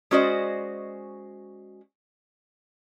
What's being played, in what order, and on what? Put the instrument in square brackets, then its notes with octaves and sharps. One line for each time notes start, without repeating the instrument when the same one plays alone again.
[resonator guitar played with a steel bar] G#3 C#4 F#4 C5 D5 D#5